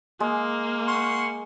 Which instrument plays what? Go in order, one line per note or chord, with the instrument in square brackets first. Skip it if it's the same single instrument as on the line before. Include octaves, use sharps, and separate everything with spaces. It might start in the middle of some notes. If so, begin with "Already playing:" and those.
[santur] G#3 [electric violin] A#3
[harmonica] F#5 C6 C#6